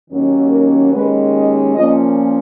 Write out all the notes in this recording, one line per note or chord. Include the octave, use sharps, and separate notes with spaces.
D#2 D#3 F#3 A#3 C#4
A#4
D#2 D#3 G#3 C#4 B4
D#5
A#2 F3 A#3 C#4 D#5